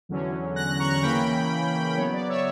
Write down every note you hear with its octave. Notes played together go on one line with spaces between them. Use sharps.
E2 D3 F#3 C#4
F#6 A#6
A#5 C#6
C#3 E3 A#3 C#4 G5 B5
C#3 F#3 B3 C#5
D5
C#5 E5